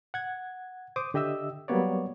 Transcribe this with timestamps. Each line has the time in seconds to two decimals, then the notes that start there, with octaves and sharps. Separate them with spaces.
0.14 F#5 G#6
0.96 C5 D6 D#6
1.14 D3 G4 D#5 E5 E6
1.68 F#3 G3 A#3 B3 C#5 D5